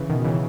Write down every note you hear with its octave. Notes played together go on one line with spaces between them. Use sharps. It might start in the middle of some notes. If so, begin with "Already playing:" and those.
Already playing: C#3 E3
B2 D#3
C#3 E3